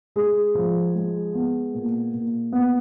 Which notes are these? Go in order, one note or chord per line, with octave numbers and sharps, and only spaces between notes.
G#3 G#4
F3
G#3
B3
A#2
A#2
B3